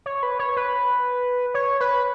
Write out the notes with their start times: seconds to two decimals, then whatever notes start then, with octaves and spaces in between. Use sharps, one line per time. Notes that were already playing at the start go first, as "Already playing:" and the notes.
0.06 C#5
0.23 B4
0.39 C#5
0.56 B4
1.54 C#5
1.80 B4